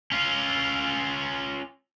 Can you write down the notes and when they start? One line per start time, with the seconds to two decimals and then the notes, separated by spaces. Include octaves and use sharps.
0.12 C#4 F4